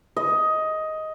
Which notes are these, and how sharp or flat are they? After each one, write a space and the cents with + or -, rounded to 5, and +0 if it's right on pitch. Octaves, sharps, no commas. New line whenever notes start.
D#5 +10